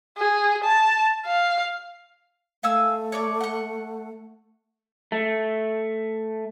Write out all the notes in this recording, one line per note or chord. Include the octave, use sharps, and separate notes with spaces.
G#4
A5
F5
A3 F5 G#5 E6
C#5 D5 D6
F#5 C#6
A3